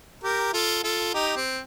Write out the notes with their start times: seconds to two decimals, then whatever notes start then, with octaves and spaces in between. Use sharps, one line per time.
0.24 G4 A#4
0.53 F4 A4
0.84 F4 A4
1.14 D#4 G4
1.37 C4